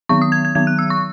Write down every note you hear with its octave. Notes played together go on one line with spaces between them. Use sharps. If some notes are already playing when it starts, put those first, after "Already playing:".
D#3 F#3 B3 C#6
D#6
G#6
G#6
D#3 F#3 B3 G#6
F#6
E6
C#6